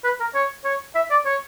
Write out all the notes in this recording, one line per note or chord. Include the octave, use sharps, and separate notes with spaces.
B4
A#4
C#5
C#5
E5
D5
C#5